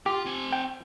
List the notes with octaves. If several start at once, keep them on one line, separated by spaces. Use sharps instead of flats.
F4 G4
C4 G#5
G5